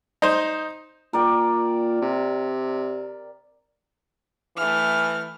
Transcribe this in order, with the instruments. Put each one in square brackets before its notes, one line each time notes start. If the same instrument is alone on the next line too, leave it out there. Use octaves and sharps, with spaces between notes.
[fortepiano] D#4 C5
[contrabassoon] A#2 [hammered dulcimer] A#4 D5 G5
[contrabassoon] C3
[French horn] E3 [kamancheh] A3 F6